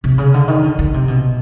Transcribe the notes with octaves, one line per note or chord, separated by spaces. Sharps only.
C3
C#3
D3
D#3
D3
D3
C3
B2